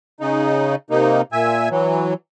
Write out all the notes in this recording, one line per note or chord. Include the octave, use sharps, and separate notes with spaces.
C#3 D#4
C3 A#3 D#4
A#2 E5 G#5
E3 F#3